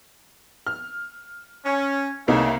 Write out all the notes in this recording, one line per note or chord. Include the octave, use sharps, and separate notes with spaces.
F6
C#4
C2 C#3 A3 A#3 D#4 E5